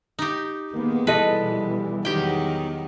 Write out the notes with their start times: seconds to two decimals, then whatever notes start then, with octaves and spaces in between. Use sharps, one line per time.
0.19 D#4 G4
0.73 D#3 G#3 A#3 B3
1.07 B2 E3 G3 E4 A4 B4 D#5
2.05 E2 D#3 F#3 G4 G5